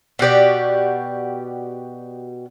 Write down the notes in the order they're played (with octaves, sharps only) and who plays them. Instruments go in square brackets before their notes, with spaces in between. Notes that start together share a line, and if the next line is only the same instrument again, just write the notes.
[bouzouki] B2 F#4 G4 D5